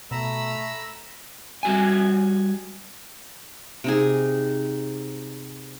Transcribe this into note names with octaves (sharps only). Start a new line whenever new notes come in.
B2 A3 A#5 B5 E6
G3 F#4 G#5
C3 D#4 G#4